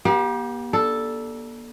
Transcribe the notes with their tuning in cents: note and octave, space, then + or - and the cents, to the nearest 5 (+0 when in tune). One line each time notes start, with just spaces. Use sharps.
A#3 +45 G4 +0
D4 +0 A4 +0